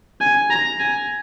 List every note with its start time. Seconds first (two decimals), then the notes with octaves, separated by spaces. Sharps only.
0.21 G#5
0.50 A#5
0.79 G#5